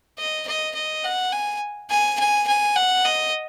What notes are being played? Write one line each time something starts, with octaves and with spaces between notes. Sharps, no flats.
D#5
D#5
D#5
F#5
G#5
G#5
G#5
G#5
F#5
D#5